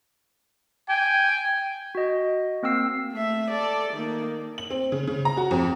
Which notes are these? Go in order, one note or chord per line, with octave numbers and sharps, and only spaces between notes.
G5 G#5
F#4 D#5
A#3 C4 G5 E6 C7
A3 E5
A4 D5
D#3 A#3
F#7
C4
C#3
C#3
A#5
F#4
F2